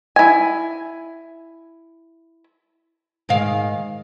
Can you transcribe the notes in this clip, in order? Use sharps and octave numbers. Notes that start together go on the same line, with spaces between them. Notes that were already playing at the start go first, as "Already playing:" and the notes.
E4 G#5
G#2 D#3 F5